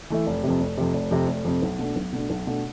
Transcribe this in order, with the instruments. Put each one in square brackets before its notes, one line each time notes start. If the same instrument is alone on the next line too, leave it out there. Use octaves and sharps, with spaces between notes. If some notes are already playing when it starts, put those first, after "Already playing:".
[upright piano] E3 A3 E4
F1
F2 C3
F1
F2 C3
F1
F2 C3
F1
F2 C3
B1
B2 A3 D4
B1
B2 A3 D4
B1
B2 A3 D4